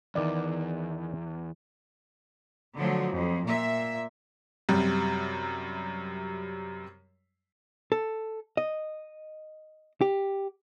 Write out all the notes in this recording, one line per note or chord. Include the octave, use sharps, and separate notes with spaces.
E2 D#3 D5
D3 F3 F#3 A3
F2
A#2 E5
F#2 C3 G3
A4
D#5
G4